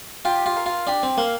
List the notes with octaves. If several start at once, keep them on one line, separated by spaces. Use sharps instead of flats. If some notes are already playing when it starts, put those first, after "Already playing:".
F4 G4
F4
A#4 F5
F4
D4 G4
C4
A#3 A#4 F5